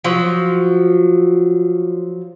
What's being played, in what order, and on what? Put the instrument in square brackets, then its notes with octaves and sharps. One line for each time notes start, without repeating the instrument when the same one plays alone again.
[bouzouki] F3 F#3